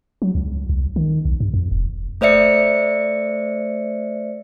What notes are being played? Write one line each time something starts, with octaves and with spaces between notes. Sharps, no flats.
F#3
C#2
C2
D#3
B1
G2
F2
E1
A3 C5 D5 E5 C#7